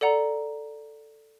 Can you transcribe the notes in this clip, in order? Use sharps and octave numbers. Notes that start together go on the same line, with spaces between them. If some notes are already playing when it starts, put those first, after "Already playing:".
A4 D5 F#5 A#5